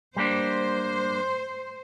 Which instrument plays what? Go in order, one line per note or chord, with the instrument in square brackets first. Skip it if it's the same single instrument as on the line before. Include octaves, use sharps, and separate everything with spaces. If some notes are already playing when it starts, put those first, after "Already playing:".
[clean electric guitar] G3 A#3 D4 [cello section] C5